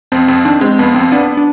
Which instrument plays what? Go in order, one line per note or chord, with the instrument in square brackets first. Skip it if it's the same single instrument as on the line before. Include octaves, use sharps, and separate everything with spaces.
[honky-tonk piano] F2 [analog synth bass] C4
[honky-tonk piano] F2 [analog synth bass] C4
[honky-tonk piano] D#3 [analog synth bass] D4
[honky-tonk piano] G#3 [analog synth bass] C4
[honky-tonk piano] F2 [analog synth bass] B3
[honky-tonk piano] F2 [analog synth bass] C4
[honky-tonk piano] B3 [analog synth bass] D4
[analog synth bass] D4